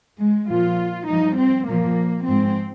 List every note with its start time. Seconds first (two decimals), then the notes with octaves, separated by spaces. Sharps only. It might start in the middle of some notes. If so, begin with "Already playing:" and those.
0.20 G#3
0.49 A#2 F3 F4
1.08 G2 F3 D#4
1.38 C4
1.68 A#2 F3 A#3
2.27 G#2 F3 C4